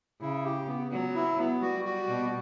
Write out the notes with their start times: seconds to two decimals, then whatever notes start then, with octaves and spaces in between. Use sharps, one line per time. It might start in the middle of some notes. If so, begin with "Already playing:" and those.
0.21 C#3 E4
0.44 G4
0.67 B3
0.91 F#3 B3
1.15 E4
1.39 B3
1.61 G3 F#4
1.85 F#4
2.09 B2